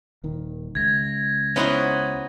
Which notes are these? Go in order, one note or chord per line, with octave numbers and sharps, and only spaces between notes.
D#1 D#3
C#2 G#6 A#6
B3 C#4 D#4 E4 F#4 C5